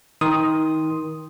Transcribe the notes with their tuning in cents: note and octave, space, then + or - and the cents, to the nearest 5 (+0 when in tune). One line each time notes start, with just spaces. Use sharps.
D#3 +25 C6 +0 D#6 +0